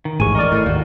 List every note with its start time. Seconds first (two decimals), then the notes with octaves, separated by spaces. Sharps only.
0.05 D#3
0.20 A1 D#2 G#2 G#3 G#5 C#6
0.35 A#4 D5 D#5 C#6 F6
0.52 A2
0.66 G#1 D#2 A#3 F#4